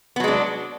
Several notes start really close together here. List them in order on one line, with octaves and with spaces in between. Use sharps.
B3 F#3 G#3 D4